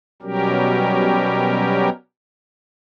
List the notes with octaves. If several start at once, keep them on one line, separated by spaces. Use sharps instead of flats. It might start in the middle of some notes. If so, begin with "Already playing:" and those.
B2 F#3 G3 C#4 G4 A#4